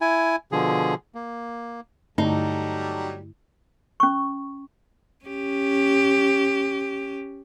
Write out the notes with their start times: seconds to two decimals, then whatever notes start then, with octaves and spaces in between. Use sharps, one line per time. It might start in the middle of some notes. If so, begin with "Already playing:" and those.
0.01 E4 G#5
0.52 B2 D3 F3 G#4
1.15 A#3
2.18 G2 D3 F#3 G3 A3 D#4 A4
4.00 C#4 C#6
5.25 C#4 G4